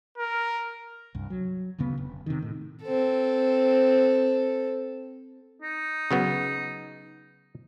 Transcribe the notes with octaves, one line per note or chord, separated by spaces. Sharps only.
A#4
C2 G2
F#3
G#1 D2 C#3 B3
F1
C3 D#3
A2
C4 A4
D#4
C#3 F#3 B3